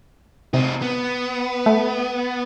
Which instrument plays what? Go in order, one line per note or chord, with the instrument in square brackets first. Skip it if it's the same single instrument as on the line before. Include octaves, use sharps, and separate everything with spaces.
[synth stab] C3 [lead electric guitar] C4 D#4
[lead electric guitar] B3
[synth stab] A3